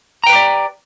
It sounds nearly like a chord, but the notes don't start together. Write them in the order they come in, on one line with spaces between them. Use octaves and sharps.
A#5 G5 B4 G4 D5